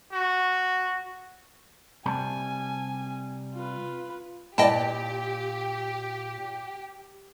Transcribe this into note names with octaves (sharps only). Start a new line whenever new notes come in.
F#4
C3 G3 G#5 A5
F4 B4
A#2 E4 G4 B4 D5 D#5 G5 A5